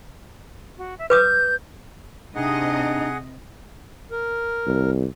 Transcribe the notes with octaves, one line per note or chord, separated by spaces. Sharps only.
F#4
E5
B4 D6 D#6 G6
C3 D4 D#4 G#4 D#5 F#5
A#4
C2